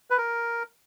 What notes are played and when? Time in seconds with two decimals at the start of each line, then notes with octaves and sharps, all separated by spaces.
0.10 B4
0.18 A#4